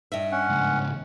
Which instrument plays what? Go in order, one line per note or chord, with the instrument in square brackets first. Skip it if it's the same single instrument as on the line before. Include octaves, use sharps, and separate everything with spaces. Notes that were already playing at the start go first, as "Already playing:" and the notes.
[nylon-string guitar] G2 D#5 E5
[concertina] C#4 F#5
[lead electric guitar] C#2 G#2